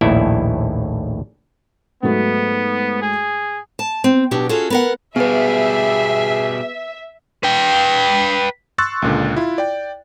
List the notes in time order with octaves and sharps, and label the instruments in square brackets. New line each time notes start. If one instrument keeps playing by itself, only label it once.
[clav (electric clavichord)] A#1 D#2 A2 E4
[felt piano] G#2 F#3 A3 [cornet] B3
[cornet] G#4
[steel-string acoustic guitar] A5
C4
B2 F#3 D4 G4
C#4 F4 F#4 G#4 A4
B3 A#4 F#5
[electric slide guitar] B2 G3 [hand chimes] B3 B4 [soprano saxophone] G#4 [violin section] E5
[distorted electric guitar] B4 G5
[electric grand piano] C6 C#6 E6 F#6 A6
C#2 A#2 D3
E4 F4
D5 G5